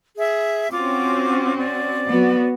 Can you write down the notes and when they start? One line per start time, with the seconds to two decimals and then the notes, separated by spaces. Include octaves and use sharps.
0.17 G#4 E5
0.72 C4 C#4 F4 F#4 D6
1.57 D5
2.05 F#3 B3 F#4